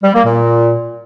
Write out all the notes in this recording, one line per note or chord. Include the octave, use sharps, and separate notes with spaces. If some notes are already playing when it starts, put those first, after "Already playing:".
G3
A#3
A#2